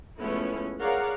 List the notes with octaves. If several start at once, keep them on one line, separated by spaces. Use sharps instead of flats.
F3 G#3 A3 B3 C#4 E4
G#4 A#4 C#5 D5 F5 F#5